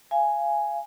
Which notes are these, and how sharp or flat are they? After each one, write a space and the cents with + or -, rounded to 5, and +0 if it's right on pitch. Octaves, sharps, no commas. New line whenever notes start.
F5 -30 G#5 +0